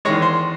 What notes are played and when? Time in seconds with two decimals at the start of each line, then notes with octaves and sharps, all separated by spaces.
0.05 E2 D#3 G#3 C#5
0.22 C5